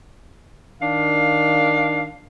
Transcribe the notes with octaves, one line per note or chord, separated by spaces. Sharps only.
D#3 D4 F5